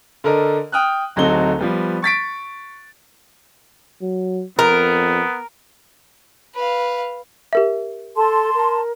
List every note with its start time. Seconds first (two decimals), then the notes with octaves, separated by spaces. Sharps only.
0.24 D3 A4 A#4 D#5
0.72 G5 D#6 F6 F#6
1.16 D1 F#3 C4 D#4 A4 G7
1.59 F3 G3 B3
2.02 C#6 A6 B6 D7
4.02 F#3
4.59 F2 B3 A#4
6.54 B4 F5
7.53 G4 A#4 E5
8.16 A4 A5 C6
8.55 A#4